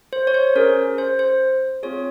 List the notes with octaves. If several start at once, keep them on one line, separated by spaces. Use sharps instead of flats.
C5
C#5
C5
C#4 G#4 A#4
C5
C5
C4 F4 G#4 C#5